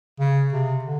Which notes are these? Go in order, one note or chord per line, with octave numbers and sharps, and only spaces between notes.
C#3
C3
D3